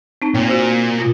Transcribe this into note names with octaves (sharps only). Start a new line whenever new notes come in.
C4 D#4 A5
A#2 C4 C#5 G5
F#4 C5
A#3
A#3 F4